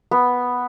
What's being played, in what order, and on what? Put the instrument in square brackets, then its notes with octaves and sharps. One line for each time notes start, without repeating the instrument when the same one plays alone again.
[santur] B3